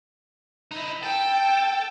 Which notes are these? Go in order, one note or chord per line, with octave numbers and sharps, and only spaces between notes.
D#4 E4
A4 G5